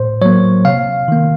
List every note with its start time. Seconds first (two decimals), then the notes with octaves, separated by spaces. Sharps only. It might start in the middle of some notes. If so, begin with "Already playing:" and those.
Already playing: A2 C5
0.22 F#3 A#3 C#5
0.65 C3 F5
1.08 D#3 A#3